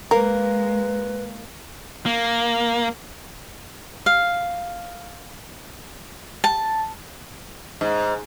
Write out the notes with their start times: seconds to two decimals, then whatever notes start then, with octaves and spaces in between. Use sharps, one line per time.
0.11 G#3 A#3 A#4 B4
2.06 A#3
4.06 F5
6.44 A5
7.81 G#2